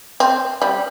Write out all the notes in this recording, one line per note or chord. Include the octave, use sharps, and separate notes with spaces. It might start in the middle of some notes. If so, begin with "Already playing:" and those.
C4
G3